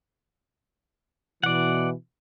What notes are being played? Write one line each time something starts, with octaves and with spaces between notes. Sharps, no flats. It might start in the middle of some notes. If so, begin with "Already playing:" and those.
B2 E3 D5 F#5